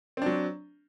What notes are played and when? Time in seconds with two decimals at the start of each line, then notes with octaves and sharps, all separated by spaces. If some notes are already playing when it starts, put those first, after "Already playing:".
0.17 C4
0.22 D4
0.26 F#3